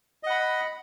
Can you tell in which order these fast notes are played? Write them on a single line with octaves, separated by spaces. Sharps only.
D#5 F#5 B5